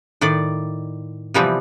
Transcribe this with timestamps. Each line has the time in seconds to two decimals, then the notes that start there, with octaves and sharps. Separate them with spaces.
0.21 A2 D#3 D5
1.34 C3 E3 F3 G3 B3 C4